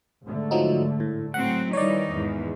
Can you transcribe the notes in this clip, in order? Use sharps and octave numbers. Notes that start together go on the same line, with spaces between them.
G#2 D3 A3
F3 F#3 D#4
A2
A2 F#3 C4 F#5
D#3 E3 G3 D#4 C#5 D5
E2 G#2